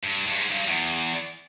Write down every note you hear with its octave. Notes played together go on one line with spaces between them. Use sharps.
G2
G2
G#2
G2
E2